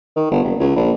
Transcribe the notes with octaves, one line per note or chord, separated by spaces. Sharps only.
D#3
G1
F#1
C#2
A#1